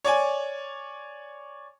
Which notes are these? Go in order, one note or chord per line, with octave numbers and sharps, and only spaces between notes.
C#5 D5 G#5